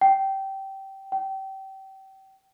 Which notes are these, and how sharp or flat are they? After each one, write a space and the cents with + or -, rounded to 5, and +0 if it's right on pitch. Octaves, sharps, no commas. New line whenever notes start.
G5 -20
G5 -30